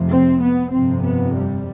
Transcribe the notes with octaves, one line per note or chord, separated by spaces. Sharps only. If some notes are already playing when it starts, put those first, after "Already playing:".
Already playing: F1 F2 C3
C4
B3
G1 F2 C3 C4
B3
G3